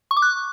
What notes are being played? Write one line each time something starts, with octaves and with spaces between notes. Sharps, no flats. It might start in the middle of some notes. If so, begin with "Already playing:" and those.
C#6
D6
F#6